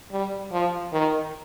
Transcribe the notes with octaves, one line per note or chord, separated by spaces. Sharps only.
G3
F3
D#3